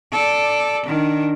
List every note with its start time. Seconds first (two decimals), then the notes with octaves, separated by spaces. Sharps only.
0.12 A4 D5
0.86 D#3 D4